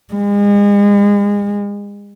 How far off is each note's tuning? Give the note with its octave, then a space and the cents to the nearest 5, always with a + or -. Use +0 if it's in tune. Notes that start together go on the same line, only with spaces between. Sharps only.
G#3 -35